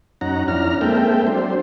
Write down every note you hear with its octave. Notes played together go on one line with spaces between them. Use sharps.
F#2 C#4 D#4 F#5 A#5
F2 C#4 D4 E4 A#5 F6
G#3 A#3 C4 A4 E5 G5
F#3 D4 C5